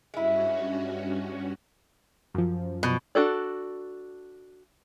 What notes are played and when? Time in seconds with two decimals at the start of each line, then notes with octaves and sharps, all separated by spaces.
0.14 G2 G#3 C#4 E4 F#4
2.34 F#2 F3
2.83 B2
3.15 D4 F#4 A4 D5